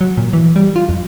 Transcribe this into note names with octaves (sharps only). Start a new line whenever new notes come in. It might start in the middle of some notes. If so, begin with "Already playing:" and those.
F#3
A#2
E3
G3
F4
F2